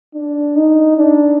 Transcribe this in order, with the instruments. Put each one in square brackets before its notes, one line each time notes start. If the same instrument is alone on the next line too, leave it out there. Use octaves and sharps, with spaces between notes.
[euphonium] D4
D#4
D4